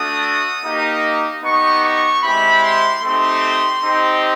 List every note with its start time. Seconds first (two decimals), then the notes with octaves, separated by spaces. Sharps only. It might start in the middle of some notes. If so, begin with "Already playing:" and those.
Already playing: A3 D4 F#4 D#6
0.64 A#3 D#4 G4
1.43 B3 D#4 G4 C#6
1.84 C#6
2.23 G#3 C4 E4 G4 B5
2.64 C6
3.03 A3 C4 D#4 G4 C6
3.83 C4 D#4 G4